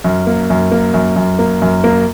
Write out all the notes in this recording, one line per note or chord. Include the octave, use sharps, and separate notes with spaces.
F#2
A#3
F#2
A#3
F#2
F#2
A#3
F#2
A#3